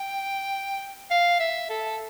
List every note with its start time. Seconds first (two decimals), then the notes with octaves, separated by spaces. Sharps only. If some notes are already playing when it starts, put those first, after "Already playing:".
Already playing: G5
1.11 F5
1.40 E5
1.70 A4